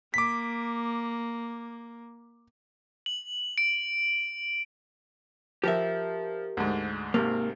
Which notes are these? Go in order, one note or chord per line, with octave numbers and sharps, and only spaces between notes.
A#3 D6 B6
F#7
D7
F3 G4 A#4 E5
D2 G#2
G#1 C3 A#3